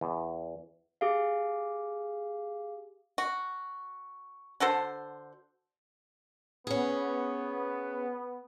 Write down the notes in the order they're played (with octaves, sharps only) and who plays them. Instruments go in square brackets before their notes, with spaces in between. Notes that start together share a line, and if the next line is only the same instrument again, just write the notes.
[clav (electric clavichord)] E2
[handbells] G4 G#4 F5
[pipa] F#4
D3 F#4 A4 C5
[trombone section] B3 [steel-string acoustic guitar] C#4 G#4